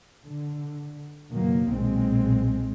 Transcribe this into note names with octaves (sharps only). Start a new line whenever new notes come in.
D3
F#1 B2 D#3 F#3 A#3
B1 A#2 G#3 C4